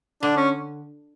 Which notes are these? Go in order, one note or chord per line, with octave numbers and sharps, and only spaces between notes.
D3 D4
C#4